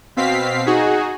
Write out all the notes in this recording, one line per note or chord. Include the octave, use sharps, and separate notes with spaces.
B2 C4 F5 B6 C7
D#4 F#4 G#4